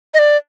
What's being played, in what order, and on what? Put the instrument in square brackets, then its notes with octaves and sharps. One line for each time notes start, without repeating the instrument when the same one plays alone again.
[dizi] D#5
D5